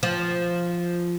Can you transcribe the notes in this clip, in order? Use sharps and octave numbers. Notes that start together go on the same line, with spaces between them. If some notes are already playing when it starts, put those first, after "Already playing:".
F3